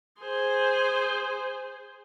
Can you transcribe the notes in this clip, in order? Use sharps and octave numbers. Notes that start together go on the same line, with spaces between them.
G#4 C5